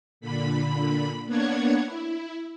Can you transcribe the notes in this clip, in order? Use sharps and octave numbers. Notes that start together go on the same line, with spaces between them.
A#2 D3 B5
A#3 B3 D4 C#5 F#5 G#6
E4